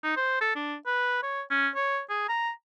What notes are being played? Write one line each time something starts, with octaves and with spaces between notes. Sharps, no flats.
D#4
C5
A4
D4
B4
C#5
C#4
C#5
G#4
A#5